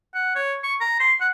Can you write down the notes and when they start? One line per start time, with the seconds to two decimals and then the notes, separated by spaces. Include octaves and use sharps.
0.14 F#5
0.35 C#5
0.63 C#6
0.81 A#5
1.00 C6
1.20 F#5